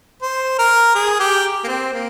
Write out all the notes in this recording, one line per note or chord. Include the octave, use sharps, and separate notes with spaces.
C5
A#4
G#4
G4
A#3
C4
A#3